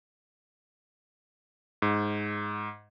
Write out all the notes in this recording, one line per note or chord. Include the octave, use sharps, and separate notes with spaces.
G#2